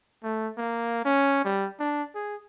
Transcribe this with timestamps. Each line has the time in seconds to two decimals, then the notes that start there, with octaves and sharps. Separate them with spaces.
0.23 A3
0.58 A#3
1.05 C#4
1.45 G3
1.79 D4
2.15 G#4